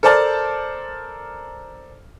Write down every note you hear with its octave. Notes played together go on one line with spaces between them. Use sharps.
A4 A#4 C5 D5 A5 F6